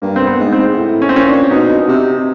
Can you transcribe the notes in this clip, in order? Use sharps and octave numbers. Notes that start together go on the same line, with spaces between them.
G2 A#3
C4
B3
G#2
C4
A2
C#4
C4
A#2 C#4
D4
B2 D#4
C3